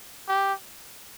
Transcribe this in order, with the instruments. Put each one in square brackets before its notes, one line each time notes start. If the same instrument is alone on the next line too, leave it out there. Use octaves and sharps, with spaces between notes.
[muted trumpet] G4